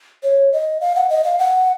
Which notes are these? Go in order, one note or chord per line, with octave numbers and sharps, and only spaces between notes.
C#5
D#5
F5
F#5
D#5
F5
F#5